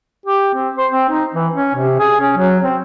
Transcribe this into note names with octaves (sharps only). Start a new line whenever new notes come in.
G4
C4
C5
C4
D#4
E3
C#4
C3
G#4
C#4
F#3
C4